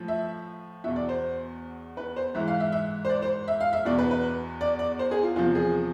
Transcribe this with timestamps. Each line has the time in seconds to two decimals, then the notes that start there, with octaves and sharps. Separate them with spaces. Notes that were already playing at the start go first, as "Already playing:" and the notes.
Already playing: A2 F3
0.08 E5
0.84 E2 B2 E5
0.96 D5
1.09 C5
1.97 B4
2.16 C5
2.35 G#2 E3 E5
2.48 F5
2.60 E5
2.72 E5
3.05 C5
3.09 D5
3.22 C5
3.48 E5
3.60 F5
3.73 E5
3.85 E2 B2 D5
3.98 B4
4.11 B4
4.61 D5
4.79 D5
4.99 C5
5.11 G#4
5.23 F4
5.36 E2 C3 F3 F4
5.55 G#4